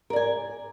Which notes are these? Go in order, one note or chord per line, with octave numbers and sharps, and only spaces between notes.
A#4 D5 G#5